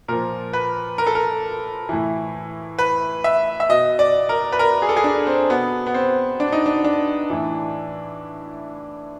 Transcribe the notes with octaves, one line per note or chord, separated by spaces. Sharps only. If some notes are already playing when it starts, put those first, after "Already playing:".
A#2 F3 A#4
B4
A#4
A4
A#4
A2 E3
B4
E5
E5
B2 D#5
D5
A#4
B4
A#4
G#4
A4
G#4
D4
C4
B2 B3
B3
C4
D4
D#4
D4
D4
A2 E3